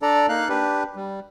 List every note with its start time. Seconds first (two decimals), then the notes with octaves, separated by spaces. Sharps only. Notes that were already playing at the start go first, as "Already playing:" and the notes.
0.02 D4 A4 D5 A#5
0.29 A#3 D#4 F5 F#6
0.49 D4 G4 B4
0.96 G3